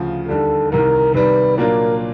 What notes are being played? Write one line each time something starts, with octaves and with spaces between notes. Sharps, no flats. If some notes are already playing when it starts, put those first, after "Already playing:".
Already playing: D2 C#3 F3
D#2 D3 G3 A4
C2 C3 D#3 A#4
C3 D#3 G3 B4
A#2 F#3 A#3 D4 F4 A#4